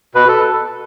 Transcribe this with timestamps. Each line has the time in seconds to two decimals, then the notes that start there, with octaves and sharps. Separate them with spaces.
0.15 B2 B4
0.28 A4